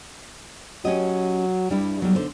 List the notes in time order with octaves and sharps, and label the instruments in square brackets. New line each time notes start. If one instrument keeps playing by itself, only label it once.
[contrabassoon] F#3 [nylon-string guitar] C#4 G4 D#5
[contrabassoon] G2 [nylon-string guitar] G3 E4
[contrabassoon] B1 [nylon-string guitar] F#3 G3
[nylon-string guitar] D3 C5